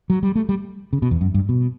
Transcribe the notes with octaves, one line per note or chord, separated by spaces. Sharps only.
F#3
G3
A3
G3
C#3
B2
E2
F#2
G2
B2